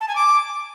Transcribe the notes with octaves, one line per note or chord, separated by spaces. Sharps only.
A5
G#5
D6